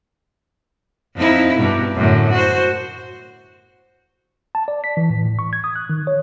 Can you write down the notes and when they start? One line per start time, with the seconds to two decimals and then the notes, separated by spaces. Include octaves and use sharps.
1.15 F2 D#4 E4
1.56 G2 B2
1.96 F#2 A2 D3
2.31 F#4 C5
4.55 A5
4.68 D5
4.84 B6
4.97 E3
5.10 A2
5.26 A2
5.39 C#6
5.53 G#6
5.64 D#6
5.76 F#6
5.90 D#3
6.07 C#5